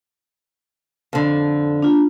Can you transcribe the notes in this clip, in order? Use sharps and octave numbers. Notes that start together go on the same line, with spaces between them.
F2 D3
D4 F4